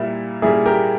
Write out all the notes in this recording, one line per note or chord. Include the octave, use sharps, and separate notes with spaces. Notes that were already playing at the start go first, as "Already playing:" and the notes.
Already playing: A#2 G3 A#3 E4
A#2 G3 A#3 E4 G#4
G4 A#4